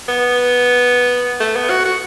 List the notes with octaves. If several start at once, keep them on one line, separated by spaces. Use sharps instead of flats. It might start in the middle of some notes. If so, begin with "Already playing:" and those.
B3
A3
B3
F#4
F#4